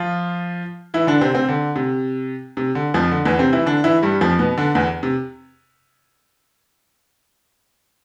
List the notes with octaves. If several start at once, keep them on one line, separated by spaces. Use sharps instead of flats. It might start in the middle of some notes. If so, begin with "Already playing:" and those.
Already playing: F3 F4
E3 E4
D3 D4
C3 C4
C3 C4
D3
C3
C3
D3
F2 F3
D3
E2 E3
C3 C4
E3 E4
D3 D4
E3 E4
G2 G3
F2 F3
B2 B3
D3 D4
E2 E3
C3